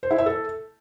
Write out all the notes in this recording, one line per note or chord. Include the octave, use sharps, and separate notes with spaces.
C5
E4
E5
A4